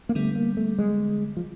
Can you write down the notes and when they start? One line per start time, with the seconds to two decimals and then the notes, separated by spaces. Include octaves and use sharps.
0.09 A#3
0.15 D3 G3 A3 B3
0.36 A#3
0.57 A3
0.79 G#3
1.37 F3